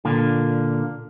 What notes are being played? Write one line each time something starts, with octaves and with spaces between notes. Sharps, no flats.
A#2 D3 A#3